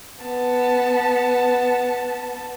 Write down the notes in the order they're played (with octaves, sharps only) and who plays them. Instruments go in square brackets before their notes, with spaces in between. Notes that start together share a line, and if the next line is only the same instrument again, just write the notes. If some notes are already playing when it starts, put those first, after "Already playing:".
[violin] B3 A5